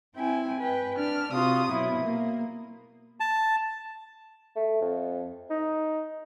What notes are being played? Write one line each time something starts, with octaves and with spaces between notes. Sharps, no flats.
C4 E4 G5 G#5
B4 G5
D4 F6
C3 F4 F#4 D#6
B2 F#3 E4
A#3
A5
A3
F2
D#4